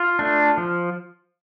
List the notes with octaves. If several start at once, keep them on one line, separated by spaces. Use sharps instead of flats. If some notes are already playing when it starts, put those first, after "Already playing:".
Already playing: F4
A3 D4
F3